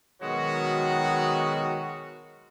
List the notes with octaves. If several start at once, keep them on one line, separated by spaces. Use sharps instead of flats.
B2 D#3 F#3 G#3 F#4